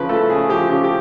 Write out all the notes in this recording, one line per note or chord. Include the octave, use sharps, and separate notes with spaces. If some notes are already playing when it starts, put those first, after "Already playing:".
Already playing: C#3 F3 B4
A3 A4
C#3 G#4
F3 G4
C#3 G4
G4